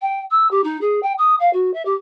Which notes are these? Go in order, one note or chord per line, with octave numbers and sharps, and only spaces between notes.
G5
E6
G4
D#4
G#4
G5
D#6
F5
F#4
E5
G4